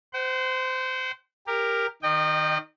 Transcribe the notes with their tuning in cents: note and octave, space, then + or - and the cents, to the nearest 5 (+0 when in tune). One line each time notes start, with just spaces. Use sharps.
C5 -20 F#5 +40
G4 +20 A#4 +0
D#3 +0 D#5 -35 G5 +0